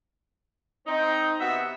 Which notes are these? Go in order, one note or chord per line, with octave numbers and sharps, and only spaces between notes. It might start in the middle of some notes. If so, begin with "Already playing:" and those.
C4 D#4
C3 B3 F#4 E5